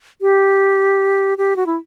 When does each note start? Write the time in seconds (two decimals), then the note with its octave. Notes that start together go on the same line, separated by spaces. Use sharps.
0.21 G4
1.38 G4
1.56 F#4
1.66 E4